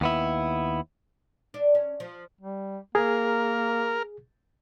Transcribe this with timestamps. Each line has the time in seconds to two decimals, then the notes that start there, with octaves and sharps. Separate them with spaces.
0.01 D#2 B3 E4
1.54 D4
1.75 C#4
2.00 F3
2.41 G3
2.95 A#3 G#4 A#4